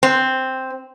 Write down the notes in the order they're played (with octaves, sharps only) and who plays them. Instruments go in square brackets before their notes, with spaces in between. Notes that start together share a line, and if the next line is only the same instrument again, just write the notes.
[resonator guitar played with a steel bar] C4